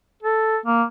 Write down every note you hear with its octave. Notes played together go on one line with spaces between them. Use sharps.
A4
A#3